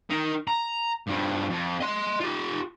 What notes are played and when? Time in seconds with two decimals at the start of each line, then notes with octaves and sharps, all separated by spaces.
0.10 D#4 A#4
0.48 A#5
1.08 G2 F3
1.50 F2
1.81 D#5 C6
2.21 F4 G4